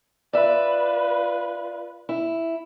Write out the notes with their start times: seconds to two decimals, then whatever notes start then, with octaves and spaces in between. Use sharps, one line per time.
0.33 F4 B4 D5 E5
2.09 E4